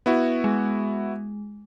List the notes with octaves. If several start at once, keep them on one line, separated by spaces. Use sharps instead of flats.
B3 E4 F#4
G#3